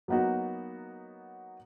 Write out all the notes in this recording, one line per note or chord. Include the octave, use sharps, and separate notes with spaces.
F#3 A#3 B3 D#4 F#4